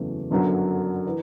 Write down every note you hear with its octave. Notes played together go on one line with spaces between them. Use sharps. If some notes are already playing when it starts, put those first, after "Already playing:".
Already playing: F#1 E2 C#3 F#3 A3
G1 F#2 D3 F#3
E3